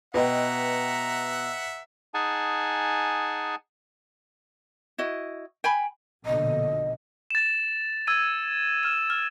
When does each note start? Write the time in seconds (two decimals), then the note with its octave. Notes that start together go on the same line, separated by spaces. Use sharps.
0.14 B2 B4 D#5 E5 F#5 G5 A#5
2.14 D#4 G#4 F#5 G#5 A5
4.98 E4 F#4 D#5
5.64 G5 G#5 B5
6.26 A#1 B2 D3 D#5
7.31 A6 E7
8.07 E6 G#6 D#7
8.83 F6 E7
9.10 F6